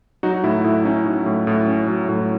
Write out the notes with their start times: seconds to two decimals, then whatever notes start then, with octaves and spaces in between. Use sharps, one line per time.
0.23 F#3 D#4 F#4
0.44 A2 E4
0.64 A2 E4
0.85 C#4 D#4
1.06 F#3
1.26 A2
1.47 A2
1.67 C#4
1.88 F#3
2.09 A2